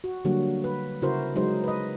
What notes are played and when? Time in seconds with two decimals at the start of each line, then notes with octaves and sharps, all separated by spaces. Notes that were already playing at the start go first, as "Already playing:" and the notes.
0.04 F#4
0.25 D3 F#3 G3 A#3 F#4
0.64 B4
1.02 C#3 E4 F#4 A#4 C5
1.36 F#3 G#3 D#4 C5
1.64 B4 D#5